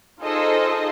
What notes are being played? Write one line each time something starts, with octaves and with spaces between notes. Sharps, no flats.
D#4 F4 G#4 A4 C5 D#5